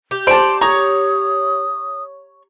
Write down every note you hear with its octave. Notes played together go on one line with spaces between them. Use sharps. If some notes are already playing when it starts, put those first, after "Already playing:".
G4
C5 D5 A5 C6
C#5 A#5 D#6